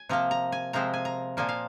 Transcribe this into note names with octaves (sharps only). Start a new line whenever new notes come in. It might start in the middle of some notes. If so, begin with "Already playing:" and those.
Already playing: G#5
C3 F3 A#3 A#5
A#5
G#5
C3 F3 G#3 C4 A#5
G#5
A#5
A#2 F3 A#3 G#5
F5